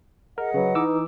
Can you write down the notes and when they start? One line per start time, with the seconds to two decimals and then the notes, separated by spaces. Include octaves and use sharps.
0.38 G#4 A#4 D#5 F#5
0.54 C#3 F#3 B4
0.75 E3 D#4 D6 E6